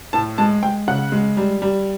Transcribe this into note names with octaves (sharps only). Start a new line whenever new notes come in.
A2 A5
G#3 A5
G#3 G5
C#3 F#5
G#3
G3
G3